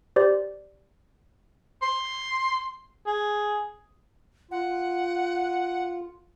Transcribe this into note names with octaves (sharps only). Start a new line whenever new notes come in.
G4 C5 D5
C6
G#4
F4 F#5